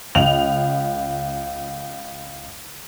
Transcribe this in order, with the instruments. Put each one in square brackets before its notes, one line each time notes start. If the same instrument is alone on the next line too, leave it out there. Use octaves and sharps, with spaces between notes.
[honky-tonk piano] C#2 F7 F#7